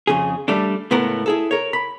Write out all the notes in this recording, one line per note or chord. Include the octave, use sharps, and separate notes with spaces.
F2 C#3 G#4
G3 A3 D4
C#2 A2 A3 B3 A#4
E4 G#4 A4
A#4 C#5
B5